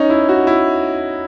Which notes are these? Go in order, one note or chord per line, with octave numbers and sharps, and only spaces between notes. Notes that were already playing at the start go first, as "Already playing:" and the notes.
Already playing: C#4 D#4
E4
F#4
E4